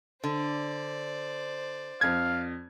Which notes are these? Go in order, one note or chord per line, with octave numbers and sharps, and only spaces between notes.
D3 C5 D5
F2 F5 G#6